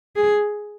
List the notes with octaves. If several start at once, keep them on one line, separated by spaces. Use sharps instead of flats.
G#4